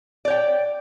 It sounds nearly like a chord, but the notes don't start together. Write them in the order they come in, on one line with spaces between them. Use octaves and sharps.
D5 C#5 G5